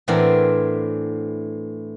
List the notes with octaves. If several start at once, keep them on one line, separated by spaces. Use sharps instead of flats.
A2 E3 B3 C4 D4 A#4